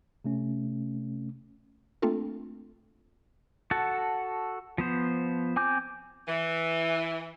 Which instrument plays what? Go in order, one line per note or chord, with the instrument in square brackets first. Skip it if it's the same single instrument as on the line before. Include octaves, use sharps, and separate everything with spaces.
[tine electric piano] C3 A3 C#4
[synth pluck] A3 A#3 C4 D4 F4 A4
[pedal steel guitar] F#4 A4 F#5 A5
F3 B3 C5
C4 G#5 D6 G6
[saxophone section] E3